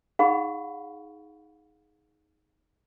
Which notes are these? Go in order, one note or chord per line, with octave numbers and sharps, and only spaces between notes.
D#4 G#4 F5 F#5 B5 C#6